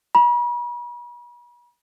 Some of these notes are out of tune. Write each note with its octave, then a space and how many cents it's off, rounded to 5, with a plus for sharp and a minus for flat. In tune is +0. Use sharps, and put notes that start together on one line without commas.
B5 -40